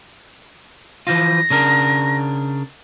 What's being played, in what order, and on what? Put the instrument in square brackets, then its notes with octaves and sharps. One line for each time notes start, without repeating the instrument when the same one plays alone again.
[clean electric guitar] E3 F3 F4 [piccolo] A#6
[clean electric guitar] C#3 D4 A#4